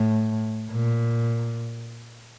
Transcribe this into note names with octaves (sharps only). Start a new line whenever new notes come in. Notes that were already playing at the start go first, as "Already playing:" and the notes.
Already playing: A2
A#2